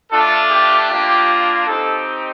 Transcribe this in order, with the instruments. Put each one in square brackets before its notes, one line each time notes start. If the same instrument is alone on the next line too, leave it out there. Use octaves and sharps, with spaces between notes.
[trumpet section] A3 D4 F4 A4
G4
A#3 D4 F4
C4 D#4 G4 A4